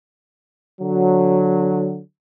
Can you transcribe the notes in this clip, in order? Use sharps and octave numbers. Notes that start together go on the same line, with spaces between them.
D3 F#3